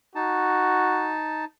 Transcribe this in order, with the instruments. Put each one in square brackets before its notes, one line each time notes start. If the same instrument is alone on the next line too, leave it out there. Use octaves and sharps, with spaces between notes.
[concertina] D#4 A5 [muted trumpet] F#4